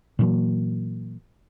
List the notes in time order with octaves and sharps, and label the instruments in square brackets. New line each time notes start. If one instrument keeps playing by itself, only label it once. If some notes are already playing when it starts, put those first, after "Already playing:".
[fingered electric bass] A#2 E3 F#3 A#3